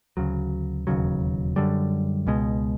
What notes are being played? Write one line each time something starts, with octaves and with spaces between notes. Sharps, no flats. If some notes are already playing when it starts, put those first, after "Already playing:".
D2 C#3 F#3
E1 D#2 C#3 F#3
F#2 D3 G3
C#2 B2 G#3